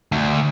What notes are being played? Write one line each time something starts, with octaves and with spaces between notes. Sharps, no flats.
D2